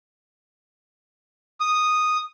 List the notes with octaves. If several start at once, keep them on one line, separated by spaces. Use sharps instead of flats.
D#6